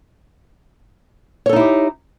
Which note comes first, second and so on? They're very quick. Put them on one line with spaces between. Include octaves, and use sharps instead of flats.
C#5 A4 D#4 E4 G4